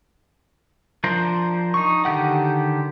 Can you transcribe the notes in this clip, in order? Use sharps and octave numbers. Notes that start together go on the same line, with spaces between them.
F3 D4 A#4 C5
D#4 C#6
D3 D#3 G4 F#5